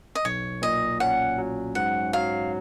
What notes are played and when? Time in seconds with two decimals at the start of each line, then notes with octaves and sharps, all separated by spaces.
0.15 D#5
0.25 B1 C#5
0.62 A#2 D#5
1.00 C#4 F#5
1.38 F#3
1.75 G#2 F#5
2.13 F#3 F5